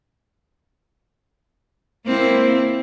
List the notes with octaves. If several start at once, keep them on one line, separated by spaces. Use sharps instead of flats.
A#3 C4 E4